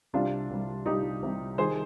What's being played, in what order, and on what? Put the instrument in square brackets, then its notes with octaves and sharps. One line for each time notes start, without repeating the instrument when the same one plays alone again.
[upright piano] C2 C3 G3 D4 F4
C2 C3 G3
C2 C3 G3 D#4 G4
C2 C3 G3
D#3 G3 G#4 C5